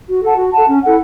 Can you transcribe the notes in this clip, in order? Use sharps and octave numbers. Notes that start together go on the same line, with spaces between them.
F#4
A4 F#5 A5
F#4
A4 F#5 A5
C#4
E4 A4 F#5